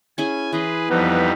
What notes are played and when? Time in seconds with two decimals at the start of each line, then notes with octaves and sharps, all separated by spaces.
0.18 C#4 E4 G#4 G#5
0.52 E3 G#4 B4 A#5 C6
0.89 F2 F3 G3 B3 D#4 B4